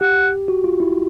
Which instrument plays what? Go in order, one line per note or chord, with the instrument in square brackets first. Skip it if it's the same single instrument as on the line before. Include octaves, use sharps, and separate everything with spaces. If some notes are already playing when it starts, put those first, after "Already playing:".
[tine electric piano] G4 [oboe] F#5
[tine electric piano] F#4
F4
E4